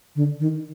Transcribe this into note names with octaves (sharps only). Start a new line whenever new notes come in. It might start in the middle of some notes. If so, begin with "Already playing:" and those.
D3
D#3